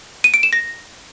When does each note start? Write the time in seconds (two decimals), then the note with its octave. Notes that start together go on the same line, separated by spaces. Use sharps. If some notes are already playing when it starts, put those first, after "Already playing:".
0.24 D#7
0.34 D7
0.43 E7
0.53 A#6